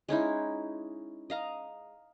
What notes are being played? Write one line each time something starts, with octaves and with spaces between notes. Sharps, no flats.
G#3 C#4 D#4 E4
D#5 F5 A#5